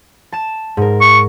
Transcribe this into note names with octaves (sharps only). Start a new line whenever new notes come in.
A5 E7
G#2 A#4
C#6